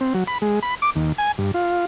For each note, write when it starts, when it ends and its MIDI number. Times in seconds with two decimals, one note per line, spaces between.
0.01 0.13 60
0.14 0.24 54
0.27 0.38 83
0.42 0.59 56
0.63 0.75 83
0.82 0.90 86
0.96 1.12 39
1.18 1.32 80
1.38 1.51 43
1.54 1.85 65